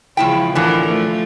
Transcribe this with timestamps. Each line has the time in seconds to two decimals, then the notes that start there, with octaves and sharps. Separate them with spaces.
0.17 E2 C#3 F3 G#3 E4 G5
0.55 A2 D3 E3 F3 A#4
0.87 F3 A3